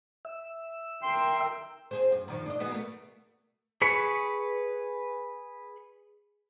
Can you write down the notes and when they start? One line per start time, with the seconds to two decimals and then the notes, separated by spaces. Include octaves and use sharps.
0.25 E5 E6
1.03 A#4 G5 C6
1.91 C4 G#4 C5
2.12 F#2
2.28 G2 D#3 F3
2.46 D4 D#5
2.60 B3 F#4 G#4
2.71 A3 A#4
3.82 G#4 B4 B5 C#6